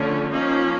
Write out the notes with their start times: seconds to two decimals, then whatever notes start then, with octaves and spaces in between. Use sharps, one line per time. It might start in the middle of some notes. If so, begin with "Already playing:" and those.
Already playing: D3 F3 A3 C#4
0.31 F3 A#3 C#4 D#4